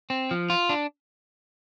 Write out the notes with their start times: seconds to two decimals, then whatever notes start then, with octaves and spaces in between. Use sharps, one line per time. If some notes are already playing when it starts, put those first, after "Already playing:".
0.10 C4
0.31 F3
0.50 F4
0.69 D4